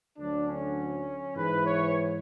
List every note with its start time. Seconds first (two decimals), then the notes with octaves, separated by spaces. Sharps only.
0.18 D2 D3 F#3 D4
0.48 C#4
1.36 G#2 E3 B4
1.66 C#5